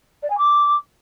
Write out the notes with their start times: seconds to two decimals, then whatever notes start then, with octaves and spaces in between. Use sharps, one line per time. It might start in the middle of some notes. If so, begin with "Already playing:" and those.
0.22 D5
0.30 G#5
0.37 D6